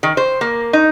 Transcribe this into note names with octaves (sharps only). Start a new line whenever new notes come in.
D#3
C5
A#3
D#4